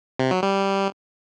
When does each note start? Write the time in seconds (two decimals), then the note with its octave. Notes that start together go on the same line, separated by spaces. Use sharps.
0.19 C3
0.31 F#3
0.43 G3